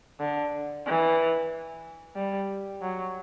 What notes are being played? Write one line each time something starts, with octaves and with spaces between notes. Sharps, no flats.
D3
E3
G3
F#3